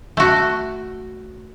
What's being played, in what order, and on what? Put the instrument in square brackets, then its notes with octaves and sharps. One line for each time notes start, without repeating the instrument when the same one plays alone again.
[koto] A3 F#4